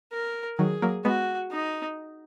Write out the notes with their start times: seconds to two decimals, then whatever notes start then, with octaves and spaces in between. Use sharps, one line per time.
0.12 A#4
0.58 D#3 F#3 G#4
0.82 F#3 A#3
1.05 G#3 B3 F#4
1.51 D#4